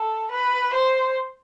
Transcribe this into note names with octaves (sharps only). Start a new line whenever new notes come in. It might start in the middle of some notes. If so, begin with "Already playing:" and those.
Already playing: A4
B4
C5